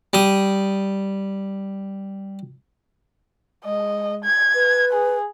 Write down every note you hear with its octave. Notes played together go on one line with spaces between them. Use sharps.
G3 D#6
G#3 D#5
G#6
B4
G#4